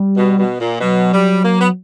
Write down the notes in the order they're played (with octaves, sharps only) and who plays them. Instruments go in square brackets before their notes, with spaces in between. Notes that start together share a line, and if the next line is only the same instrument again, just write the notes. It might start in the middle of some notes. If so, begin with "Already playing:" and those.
Already playing: [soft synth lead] G3
[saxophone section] B2
B2
A#2
[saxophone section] B2 [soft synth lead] F#3
[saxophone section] G3
A#3
B3